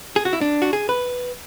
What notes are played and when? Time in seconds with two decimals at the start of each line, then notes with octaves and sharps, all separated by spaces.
0.16 G#4
0.25 F#4
0.33 E4
0.41 D4
0.62 F#4
0.73 G#4
0.89 B4